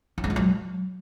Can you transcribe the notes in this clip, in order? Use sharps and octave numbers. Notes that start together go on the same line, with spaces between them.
C#4
G#3
F4
F#3